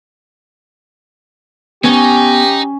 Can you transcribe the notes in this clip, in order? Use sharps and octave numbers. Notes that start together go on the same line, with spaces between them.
B3 C#4 D#4 G4